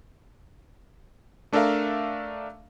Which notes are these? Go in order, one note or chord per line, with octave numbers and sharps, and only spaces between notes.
A3 D4 A4 A#4 E5 F5